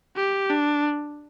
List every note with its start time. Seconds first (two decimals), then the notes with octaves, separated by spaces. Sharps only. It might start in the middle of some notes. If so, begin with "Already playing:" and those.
0.16 G4
0.50 D4